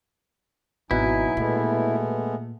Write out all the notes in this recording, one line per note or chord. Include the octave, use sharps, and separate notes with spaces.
G#1 B2 F#3 D#4 E4 G#5
A#2 G#3 A3 B3